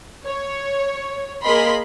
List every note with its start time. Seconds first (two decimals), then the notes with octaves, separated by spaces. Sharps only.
0.24 C#5
1.42 A#3 G#4 A#4 D#5 B5 C6